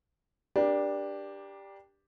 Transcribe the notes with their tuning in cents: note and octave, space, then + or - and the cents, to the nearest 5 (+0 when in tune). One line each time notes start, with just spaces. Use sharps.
D4 +0 G4 +10 A#4 +45